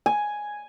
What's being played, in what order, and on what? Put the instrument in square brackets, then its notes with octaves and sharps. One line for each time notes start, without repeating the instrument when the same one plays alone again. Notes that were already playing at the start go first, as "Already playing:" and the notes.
[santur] G#5